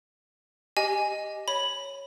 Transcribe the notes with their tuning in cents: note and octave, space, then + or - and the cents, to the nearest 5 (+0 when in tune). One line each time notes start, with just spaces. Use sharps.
G4 +0 D#5 +0 G#5 +0
C#5 +0 B5 +0